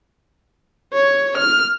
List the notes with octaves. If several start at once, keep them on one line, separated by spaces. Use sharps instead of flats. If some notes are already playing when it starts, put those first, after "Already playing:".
C#5
F6